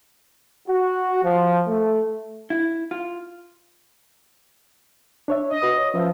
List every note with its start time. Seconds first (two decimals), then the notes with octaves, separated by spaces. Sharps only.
0.68 F#4
1.23 F3
1.67 A3
2.50 E4
2.91 F4
5.28 D4 C#5 E5
5.50 D#5
5.62 F#4 B4 D#6
5.77 C#5
5.94 F3 C#4 B4 E5